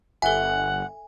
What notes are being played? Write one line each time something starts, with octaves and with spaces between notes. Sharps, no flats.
G1 A4 E5 F#5 G#5